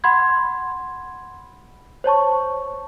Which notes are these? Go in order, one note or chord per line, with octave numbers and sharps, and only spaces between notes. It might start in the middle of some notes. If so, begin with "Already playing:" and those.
F#5 B5 C6 G#6
C5 C#5 A5 C#6